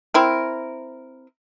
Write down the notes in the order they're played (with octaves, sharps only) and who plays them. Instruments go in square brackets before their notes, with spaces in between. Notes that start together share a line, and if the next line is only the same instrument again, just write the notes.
[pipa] C4 E4 A#4